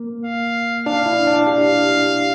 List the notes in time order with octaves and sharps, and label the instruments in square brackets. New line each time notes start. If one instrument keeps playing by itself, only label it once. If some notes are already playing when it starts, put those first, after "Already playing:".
Already playing: [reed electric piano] A#3
[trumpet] F5
[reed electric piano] D4 [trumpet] F5
[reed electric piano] E4
D4
[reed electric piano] G4 [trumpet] F5